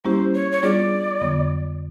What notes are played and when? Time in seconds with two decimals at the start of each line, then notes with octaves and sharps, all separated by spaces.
0.05 G3 A#3 C#4 E4 G4 C5
0.34 C#5
0.52 C#5
0.63 G3 B3 D4 F4 G#4 D5
1.21 F2 D3 F#3 B3